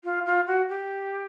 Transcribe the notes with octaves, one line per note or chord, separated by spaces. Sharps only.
F4
F4
F#4
G4